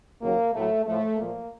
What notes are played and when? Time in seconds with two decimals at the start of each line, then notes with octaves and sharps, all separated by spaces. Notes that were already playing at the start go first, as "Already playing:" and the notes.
0.21 D#2 C#3 F#3 A#3
0.53 A2 F#3 A3
0.84 A2 F3 A3
1.16 A#2 F3 A#3